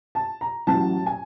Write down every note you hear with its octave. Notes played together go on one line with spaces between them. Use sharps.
A5
A#5
A1 A2 F#3 A5
G#5